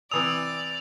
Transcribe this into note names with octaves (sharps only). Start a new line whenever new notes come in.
C3 E3 D5 D#6 F7